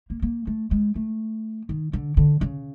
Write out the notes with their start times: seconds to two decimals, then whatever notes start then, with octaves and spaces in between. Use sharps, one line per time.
0.10 A#3
0.22 A#3
0.47 A3
0.71 G#3
0.95 A3
1.69 D#3
1.93 D3
2.17 D3
2.41 C#3